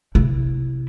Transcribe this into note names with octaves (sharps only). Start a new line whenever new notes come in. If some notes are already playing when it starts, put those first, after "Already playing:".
C3 E4